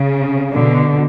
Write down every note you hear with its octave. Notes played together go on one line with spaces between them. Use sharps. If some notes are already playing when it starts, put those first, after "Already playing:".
Already playing: C#3
B2 D3